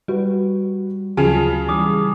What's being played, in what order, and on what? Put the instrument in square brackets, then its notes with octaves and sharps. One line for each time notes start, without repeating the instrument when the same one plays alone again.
[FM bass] G3 [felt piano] F#4 B4
[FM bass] D2 [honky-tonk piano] C#3 G#4 [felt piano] F3 F#3 [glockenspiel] G#5 A5 F7
[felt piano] E3 [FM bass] G3 [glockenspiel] D6 D#6